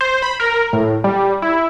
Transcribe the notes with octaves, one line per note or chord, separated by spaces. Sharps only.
C5
B5
A#4
A2
G3
E4